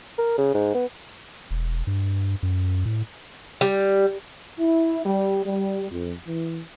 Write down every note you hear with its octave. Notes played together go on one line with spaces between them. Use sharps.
A#4
C#3
G#2
B3
E1
G2
F#2
A2
G3
E4
G3
G3
F2
E3